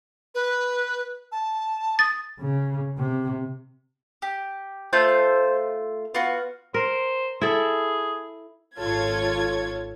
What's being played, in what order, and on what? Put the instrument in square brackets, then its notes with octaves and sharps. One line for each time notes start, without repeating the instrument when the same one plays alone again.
[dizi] B4
A5
[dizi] D#6 [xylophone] A6
[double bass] C#3
C3
[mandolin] G4
[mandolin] A3 F4 G6 [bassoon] C5
[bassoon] B3 [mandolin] F4 F#4
[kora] A#4 [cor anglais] C5
[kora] E4 A4 [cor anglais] G#4
[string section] G#1 F4 A4 C#5 G#6